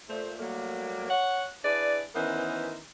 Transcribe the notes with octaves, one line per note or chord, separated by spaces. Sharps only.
A#2 A3 C5
F#3 G3 A3 A#3
C#5 F#5
D4 E4 G#4 B4 D5
D#3 E3 B3 C#4 A#4 C5